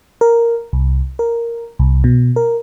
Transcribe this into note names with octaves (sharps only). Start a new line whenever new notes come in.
A#4
C2
A#4
C2
B2
A#4